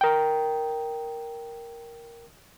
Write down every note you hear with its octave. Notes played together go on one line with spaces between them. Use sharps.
A#4 G5